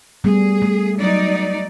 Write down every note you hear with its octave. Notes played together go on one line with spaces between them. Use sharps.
G3 A3 B3 G#4
A3
F#3 D#4 D5